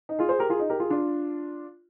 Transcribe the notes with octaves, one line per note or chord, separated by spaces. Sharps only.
D#4
F4 G#4
G#4 C5
G4 A#4
F4 G#4
D#4
G4 A#4
F4 G#4
D4 F4